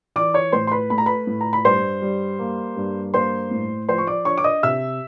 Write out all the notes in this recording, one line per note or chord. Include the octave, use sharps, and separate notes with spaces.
E3 D5 D6
C#5 C#6
A2 C5 C6
C6
B4 B5
A3 B5
A#5
B4 B5
A2
A#5
B5
G2 C5 C6
G3
A#3
G2
A#3 C5 C6
A2
F3 C5 C6
C#6
D5 D6
D4 C#5 C#6
D6
D#5 D#6
C3 E5 E6